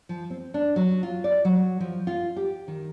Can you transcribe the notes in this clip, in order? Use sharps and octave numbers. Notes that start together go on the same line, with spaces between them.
F3
C4
D4
F#3
F4
D5
F#3
F3
F4
G4
D#3